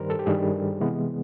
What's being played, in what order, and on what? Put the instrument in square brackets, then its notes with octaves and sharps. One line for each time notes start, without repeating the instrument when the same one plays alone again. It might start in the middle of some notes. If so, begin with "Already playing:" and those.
Already playing: [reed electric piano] G2 D#3 G3 A#4 C5
A4
G4
G2 D#3 G3 G#4
C3 E3 G#3 B3